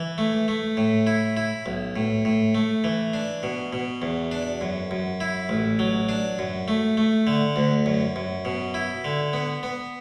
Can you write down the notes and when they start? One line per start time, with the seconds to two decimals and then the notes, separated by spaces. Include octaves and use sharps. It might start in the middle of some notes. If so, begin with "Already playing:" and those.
Already playing: E3
0.18 A3
0.48 A3
0.77 A2
1.07 E4
1.37 E4
1.66 B1
1.96 A2
2.25 A2
2.55 A3
2.84 E3
3.13 D4
3.43 B2
3.73 B2
4.02 E2
4.32 D4
4.61 F#2
4.91 F#2
5.21 E4
5.49 A1
5.79 F#3
6.09 D4
6.39 F#2
6.68 A3
6.97 A3
7.27 D3
7.56 D2
7.86 F#2
8.16 F#2
8.45 B2
8.74 E4
9.05 D3
9.33 B3
9.63 B3